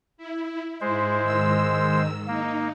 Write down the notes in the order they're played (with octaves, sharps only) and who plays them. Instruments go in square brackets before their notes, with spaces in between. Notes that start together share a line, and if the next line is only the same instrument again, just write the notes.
[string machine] E4
[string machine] G#2 E4 [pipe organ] G#3 C5
[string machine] G#2 D#3 E6
[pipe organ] A#3 [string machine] D#4